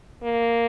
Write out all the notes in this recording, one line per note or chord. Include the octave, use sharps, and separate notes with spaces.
A#3